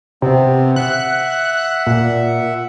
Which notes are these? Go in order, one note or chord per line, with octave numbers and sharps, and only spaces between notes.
C3 B3 C4
E5 F#5 F#6
A#2